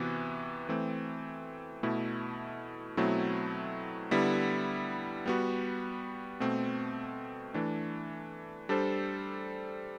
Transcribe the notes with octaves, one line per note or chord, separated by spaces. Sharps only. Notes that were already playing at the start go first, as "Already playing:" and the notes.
Already playing: C3 E3 B3 F#4
E3 A3 C4
B2 A3 E4
B2 F#3 A3 C4 E4
D3 G3 B3 E4
G3 B3 F#4
B2 A3 C4
E3 A3 D4
G3 D4 A4 C5